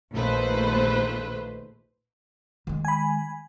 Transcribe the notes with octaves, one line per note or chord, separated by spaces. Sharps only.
A#1 D#2 A3 B4 C5
D#3 G#3
G#5 B5